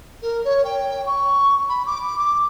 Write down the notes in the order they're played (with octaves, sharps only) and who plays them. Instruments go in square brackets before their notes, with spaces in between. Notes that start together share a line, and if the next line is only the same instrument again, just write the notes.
[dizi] A#4
C#5
G5
C#6
B5
D6
D6